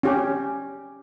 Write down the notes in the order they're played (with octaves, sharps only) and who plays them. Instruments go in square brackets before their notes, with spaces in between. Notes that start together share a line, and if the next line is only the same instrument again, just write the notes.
[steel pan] C#4 G4